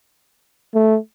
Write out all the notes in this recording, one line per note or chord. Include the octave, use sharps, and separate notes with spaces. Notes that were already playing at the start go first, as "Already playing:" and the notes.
A3